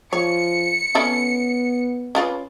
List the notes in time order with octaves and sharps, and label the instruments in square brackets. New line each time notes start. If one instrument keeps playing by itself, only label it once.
[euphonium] F3 [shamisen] C#5 [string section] C#7
[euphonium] B3 [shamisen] C#4 E4 A4
[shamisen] C#4 F4 B4